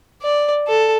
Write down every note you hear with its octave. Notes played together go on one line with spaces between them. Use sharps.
D5
A4